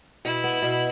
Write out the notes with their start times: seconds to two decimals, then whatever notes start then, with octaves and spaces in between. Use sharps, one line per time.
0.24 B2 E4
0.44 B3
0.62 B2